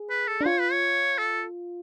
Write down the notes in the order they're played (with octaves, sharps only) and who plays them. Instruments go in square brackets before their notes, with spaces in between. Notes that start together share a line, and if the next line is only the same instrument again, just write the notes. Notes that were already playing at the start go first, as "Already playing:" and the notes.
Already playing: [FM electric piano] G#4
[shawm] B4
A4
[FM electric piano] D4
[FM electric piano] F4 [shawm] C#5
[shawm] B4
C#5
A4